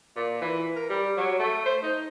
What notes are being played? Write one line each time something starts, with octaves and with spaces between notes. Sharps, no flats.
A#2
E3
A#4
G3
F#3
A3
C5
D#4